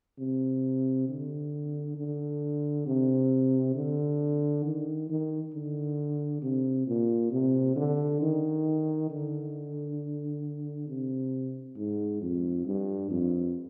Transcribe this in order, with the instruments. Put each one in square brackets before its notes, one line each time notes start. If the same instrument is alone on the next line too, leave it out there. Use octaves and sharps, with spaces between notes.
[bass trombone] C3
D3
D3
C3
D3
D#3
D#3
D3
C3
A#2
C3
D3
D#3
D3
C3
G#2
F2
G2
F2